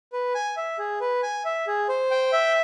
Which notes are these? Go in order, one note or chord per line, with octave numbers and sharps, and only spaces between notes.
B4
G#5
E5
G#4
B4
G#5
E5
G#4
C5
G5
E5